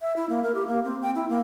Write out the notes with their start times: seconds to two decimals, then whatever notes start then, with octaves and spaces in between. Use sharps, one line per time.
0.01 E5
0.16 E4
0.29 A#3
0.43 A#4
0.55 G4
0.68 A#3
0.85 C4
1.02 G5
1.15 E4
1.30 A#3